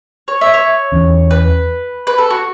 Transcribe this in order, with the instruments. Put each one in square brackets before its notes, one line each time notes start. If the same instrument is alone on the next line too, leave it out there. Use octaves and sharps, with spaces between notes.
[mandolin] C#5
E5
C#5
[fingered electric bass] E2 E3 C#4
[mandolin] B4
B4
A4
F#4